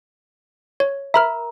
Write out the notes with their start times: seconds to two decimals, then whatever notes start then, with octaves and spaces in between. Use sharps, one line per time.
0.80 C#5
1.14 A#4 E5 A#5 B5 F6